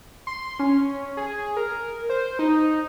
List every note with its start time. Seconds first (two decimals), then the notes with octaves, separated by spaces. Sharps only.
0.27 C6
0.59 C#4
1.17 G#4
1.57 A#4
2.09 C5
2.39 D#4